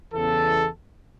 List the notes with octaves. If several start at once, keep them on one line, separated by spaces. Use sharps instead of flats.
E2 C#3 E3 A4